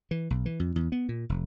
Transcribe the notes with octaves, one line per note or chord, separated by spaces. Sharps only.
E3
B1
E3
F2
E2
B3
A#2
F1